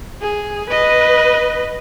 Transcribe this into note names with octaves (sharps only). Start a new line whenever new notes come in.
G#4
B4 D#5